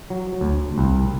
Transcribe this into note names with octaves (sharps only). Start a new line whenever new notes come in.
F#3
D2
C2